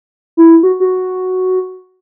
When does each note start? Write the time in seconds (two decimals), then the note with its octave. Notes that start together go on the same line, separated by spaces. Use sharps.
0.37 E4
0.63 F#4
0.80 F#4